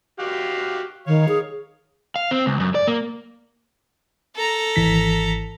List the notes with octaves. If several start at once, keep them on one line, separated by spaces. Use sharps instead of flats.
F#4 G4 F5
D#3 C#5 F5
G#4
F5
C4
C#2
F#2
D5
A#3
A4 A#5
G#1 E3 B6